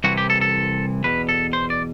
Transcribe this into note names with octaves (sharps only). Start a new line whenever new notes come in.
C2 C3 E3 F#4
G4
A4
A4
E2 B2 B4
A4
C5
D5